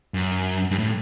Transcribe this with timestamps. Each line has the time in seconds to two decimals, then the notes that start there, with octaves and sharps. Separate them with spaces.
0.14 F#2
0.71 G2
0.78 A2